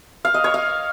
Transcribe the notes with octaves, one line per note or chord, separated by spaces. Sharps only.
F5
D#5
C#5
F5